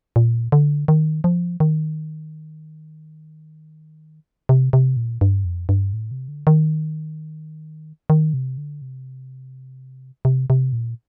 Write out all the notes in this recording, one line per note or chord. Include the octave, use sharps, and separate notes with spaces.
A#2
D3
D#3
F3
D#3
C3
C3
A#2
G2
F2
G2
A2
C3
D3
D#3
D#3
C3
D3
C3
C3
C3
A#2